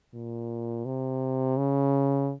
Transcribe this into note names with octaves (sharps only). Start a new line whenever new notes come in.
A#2
C3
C#3